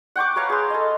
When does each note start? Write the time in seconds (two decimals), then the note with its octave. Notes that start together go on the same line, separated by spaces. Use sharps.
0.16 F#5 G5 C#6 D6
0.36 B4 C#5 F5 A#5
0.50 G#4 C6
0.70 A4 D#5